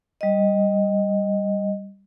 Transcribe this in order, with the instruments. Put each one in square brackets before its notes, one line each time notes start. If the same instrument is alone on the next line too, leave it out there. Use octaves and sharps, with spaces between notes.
[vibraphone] G3 D#5